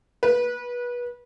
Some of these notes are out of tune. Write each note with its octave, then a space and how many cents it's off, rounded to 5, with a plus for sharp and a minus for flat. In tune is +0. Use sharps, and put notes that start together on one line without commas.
B4 -25